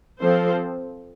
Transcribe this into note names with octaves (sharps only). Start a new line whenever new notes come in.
F3 C4 A4 C5